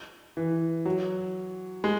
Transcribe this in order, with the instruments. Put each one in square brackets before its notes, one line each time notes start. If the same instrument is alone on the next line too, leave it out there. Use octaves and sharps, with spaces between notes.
[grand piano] E3
F#3
G#3